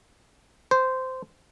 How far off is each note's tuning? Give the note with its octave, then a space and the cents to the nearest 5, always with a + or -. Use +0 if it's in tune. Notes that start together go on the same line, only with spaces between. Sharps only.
C5 -15